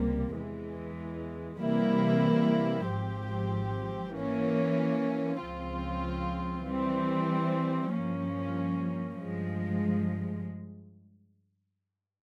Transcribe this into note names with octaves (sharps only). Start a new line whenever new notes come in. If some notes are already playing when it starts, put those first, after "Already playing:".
Already playing: C#2 C3 G3 A#3
E2 E3 G#3
C3 E3 G3 A#3 E4
G#1 G#2 F3 C4 G4
E3 A#3 C#4
C#2 C#3 F3 C4 F4
E3 G3 C4
G2 F3 A#3 C#4
G2 F3 G#3